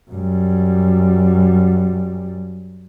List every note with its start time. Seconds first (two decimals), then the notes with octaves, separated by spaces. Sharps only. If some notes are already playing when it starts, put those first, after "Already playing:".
0.11 F#2 G3